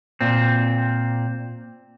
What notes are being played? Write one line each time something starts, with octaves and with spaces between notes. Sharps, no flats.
A#2 C4